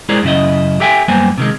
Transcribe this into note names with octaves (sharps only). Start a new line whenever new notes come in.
G#3 E4 G#4 A#4 C5 D5
F#2 C#3 E4 D#5
G4 A4 E5 G5 G#5
F#2 G3 A#3 B3 C5 G#5
C3 D#3 G#3